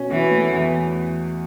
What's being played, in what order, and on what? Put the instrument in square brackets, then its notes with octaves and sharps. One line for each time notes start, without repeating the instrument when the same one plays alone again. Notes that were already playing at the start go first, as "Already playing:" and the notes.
Already playing: [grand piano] B2 C#4
[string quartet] E3 [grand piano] F#4
[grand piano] A3
E2